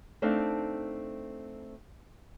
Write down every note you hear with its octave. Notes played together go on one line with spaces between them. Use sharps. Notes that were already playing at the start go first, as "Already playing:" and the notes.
A3 C4 D4 D#4 F5